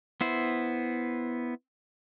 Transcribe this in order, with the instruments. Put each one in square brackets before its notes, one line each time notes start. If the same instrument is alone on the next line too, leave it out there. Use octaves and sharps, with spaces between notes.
[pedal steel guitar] B3 E4 C5